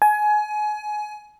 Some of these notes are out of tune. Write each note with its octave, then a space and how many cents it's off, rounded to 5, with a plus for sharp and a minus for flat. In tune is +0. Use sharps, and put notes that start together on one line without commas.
G#5 +25